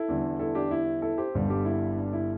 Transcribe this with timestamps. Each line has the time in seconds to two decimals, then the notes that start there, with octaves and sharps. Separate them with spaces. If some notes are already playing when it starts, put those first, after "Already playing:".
Already playing: E4 A4
0.08 E2 D3 G3
0.39 E4 A4
0.55 D4 G4
0.71 E4
1.02 E4 A4
1.18 G4 C5
1.35 G1 G2 D3 G3
1.50 D4 G4
1.65 E4
1.97 D4
2.13 E4